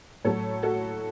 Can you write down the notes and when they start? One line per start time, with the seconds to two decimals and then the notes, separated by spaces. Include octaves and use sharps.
0.25 A2 F#3 A3 A4 C#5
0.62 F#4 A4